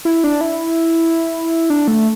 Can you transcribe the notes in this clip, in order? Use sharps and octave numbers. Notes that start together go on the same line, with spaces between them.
E4
D4
E4
D4
A3